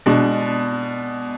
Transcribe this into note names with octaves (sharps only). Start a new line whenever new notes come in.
B2 G#3 D4